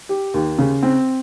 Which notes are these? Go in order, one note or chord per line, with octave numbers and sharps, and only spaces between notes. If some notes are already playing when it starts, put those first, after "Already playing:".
G4
D#2
C#3
C4